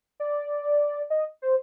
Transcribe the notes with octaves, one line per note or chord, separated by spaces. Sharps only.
D5
D#5
C5